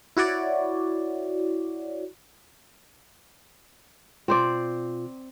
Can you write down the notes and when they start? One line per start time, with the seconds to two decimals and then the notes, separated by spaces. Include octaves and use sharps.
0.17 E4 F#4 C#5 D5
4.28 B2 C4 F4 C5 D5